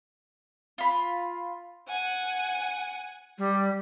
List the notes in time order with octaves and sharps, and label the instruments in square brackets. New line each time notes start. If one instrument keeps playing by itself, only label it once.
[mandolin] F4 B5
[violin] F#5 G#5
[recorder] G3